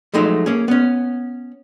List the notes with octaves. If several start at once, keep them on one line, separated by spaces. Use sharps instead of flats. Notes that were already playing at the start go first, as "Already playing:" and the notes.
F3 F#3 G#3 A3 D#4
A#3 C#4 G#4
B3 C#4